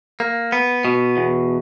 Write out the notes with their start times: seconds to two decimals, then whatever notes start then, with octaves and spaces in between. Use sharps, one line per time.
0.20 A#3
0.52 B3
0.85 B2
1.17 E2